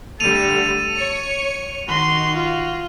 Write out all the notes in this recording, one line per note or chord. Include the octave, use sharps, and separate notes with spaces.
D3 G3 A3 A4 D#7 F7
C#5 C#7
D#3 F#4 C6
F4